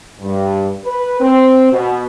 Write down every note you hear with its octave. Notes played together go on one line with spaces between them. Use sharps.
G2
B4
C4
B2